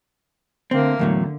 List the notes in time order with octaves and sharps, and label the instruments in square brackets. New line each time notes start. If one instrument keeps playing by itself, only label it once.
[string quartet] D3 A3 A#3 [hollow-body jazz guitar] C4
[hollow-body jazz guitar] E2 A2 F#3 [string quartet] D3